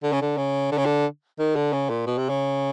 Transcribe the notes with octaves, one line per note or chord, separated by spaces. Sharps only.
D3
C#3
D3
C#3
D3
C#3
D3
D#3
D3
C#3
A#2
B2
C3
C#3